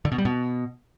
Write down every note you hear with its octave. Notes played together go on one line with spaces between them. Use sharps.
D3
B2
G3
B2